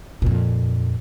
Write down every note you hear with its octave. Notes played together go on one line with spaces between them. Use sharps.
F2 A#2